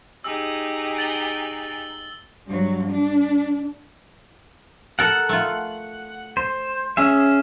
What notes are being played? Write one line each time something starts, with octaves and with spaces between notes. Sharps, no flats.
D#4 G4 G#4 E6
A6 F#7 G7
G2 F#3
D4
A4 A#4 F#5
A3 F4
C5
C#4 G#4 E5